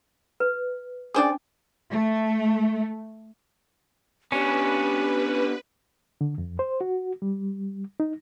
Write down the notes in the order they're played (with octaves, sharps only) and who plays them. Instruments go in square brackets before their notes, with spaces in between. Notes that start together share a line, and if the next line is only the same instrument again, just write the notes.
[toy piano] B4
[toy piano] C#4 D4 D6 [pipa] G#4 C5 D5
[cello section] A3
[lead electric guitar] B3 D4 [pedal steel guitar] C#4 [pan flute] G4 [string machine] B4
[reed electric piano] D3
F2
C5
F#4
G3
D#4